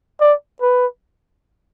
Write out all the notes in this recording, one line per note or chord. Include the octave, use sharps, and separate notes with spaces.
D5
B4